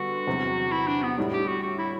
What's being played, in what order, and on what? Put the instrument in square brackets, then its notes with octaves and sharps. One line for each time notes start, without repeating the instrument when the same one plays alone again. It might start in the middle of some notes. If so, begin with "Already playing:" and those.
Already playing: [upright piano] D3 G3 B3 [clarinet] F#4
[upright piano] E2 C3 F#3
[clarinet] E4
D4
B3
[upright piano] A2 G3 D4
[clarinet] G4
F#4
F#4
E4